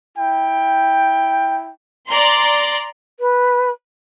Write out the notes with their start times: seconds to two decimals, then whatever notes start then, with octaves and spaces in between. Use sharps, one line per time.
0.18 E4 G5
2.07 D5 A#5 C6
3.20 B4